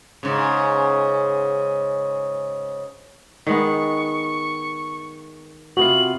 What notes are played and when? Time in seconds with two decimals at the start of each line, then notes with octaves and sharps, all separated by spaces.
0.23 G#2 C#3
3.47 D#3 G#3 B3 C#6
5.77 C3 B3 F4 F#4 F#7